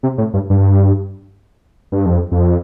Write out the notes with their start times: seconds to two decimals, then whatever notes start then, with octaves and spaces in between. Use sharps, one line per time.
0.03 C3
0.18 A2
0.34 G2
0.50 G2
1.92 G2
2.06 F2
2.31 F2